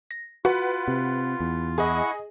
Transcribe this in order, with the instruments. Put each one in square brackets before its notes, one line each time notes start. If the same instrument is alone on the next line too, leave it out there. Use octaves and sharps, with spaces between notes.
[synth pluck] A#6
[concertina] F4 [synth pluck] F#4 [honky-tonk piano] B4 F#5
[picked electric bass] C3
E2
[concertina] E4 F#5 C#6 [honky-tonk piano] G#4 D#5